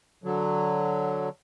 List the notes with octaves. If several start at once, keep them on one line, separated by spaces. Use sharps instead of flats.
D3 F#3